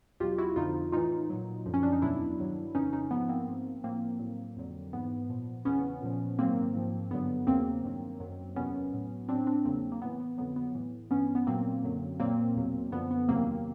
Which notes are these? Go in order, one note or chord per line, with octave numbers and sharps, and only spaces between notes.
E2 B2 F#3 F4 G4
E4 F#4
F2 D3 F3 D#4 F4
A2 E3 D#4 F4
A#2 F#3
F#2 D3 F3
C#4
D4
D#4
E2 B2 F#3 D4 E4
G2 D#3 F#3
F2 C#3 E3 C#4 D#4
C#4 D#4
G#2 F3 B3
A#3 C4
G#2 F3
A2 F3 A#3 C4
A2 F#3
F2 D3 F#3
G#2 E3 B3
A#2 F3
E2 C#3 E3 B3 C#4
A#2 F3
G#2 D#3 F#3 A#3 C4
G#2 F3
G2 D3 F#3 B3
E2 C#3 F#3 A#3 C4
G2 D#3 F#3
F#2 D#3 F#3
E2 C3 D#3 F#3 B3 C#4
A2 F#3
A2 F#3 C4 D4
C4 D4
E2 C#3 F#3 A#3 C4
A#3
A2 E3 B3
B3
F2 D3 F#3 B3
B3
A2 E3
G2 E3 B3 C#4
B3
A#2 F#3 A#3 C4
F#2 D3 F#3
A#2 F#3 A#3 C4
E2 B2 F#3
F#2 D3 F3 B3
B3
E2 C3 D#3 F#3 A#3 C4